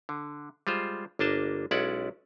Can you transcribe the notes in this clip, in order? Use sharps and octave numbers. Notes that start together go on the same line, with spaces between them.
D3
G3 G#3 F4 C5
G1 A#3 D4 D#5 A5
B1 G#3 C#4 E4 D5 F#5